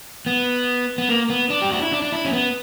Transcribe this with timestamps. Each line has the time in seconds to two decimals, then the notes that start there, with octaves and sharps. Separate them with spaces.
0.26 B3
0.98 B3
1.09 A#3
1.30 B3
1.50 D4
1.62 G4
1.71 F#4
1.82 E4
1.92 D4
2.02 D4
2.12 E4
2.25 C#4
2.33 B3